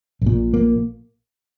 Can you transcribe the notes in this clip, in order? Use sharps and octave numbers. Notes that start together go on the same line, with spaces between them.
A#1 A#2
A#3